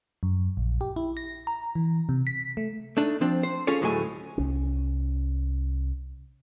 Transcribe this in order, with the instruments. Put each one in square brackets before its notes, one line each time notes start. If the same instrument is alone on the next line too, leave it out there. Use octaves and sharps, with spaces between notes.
[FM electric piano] F#2
A#1
G4
E4
A#6
A#5
E3
C3
B6
A3
[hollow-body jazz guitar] A3 D4 D#4
F3 C4 D4
C5
C#4 F4 G#4 A4 C#5
D2 A2 F#3 G#3 A3 G#5
[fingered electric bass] C2 C#4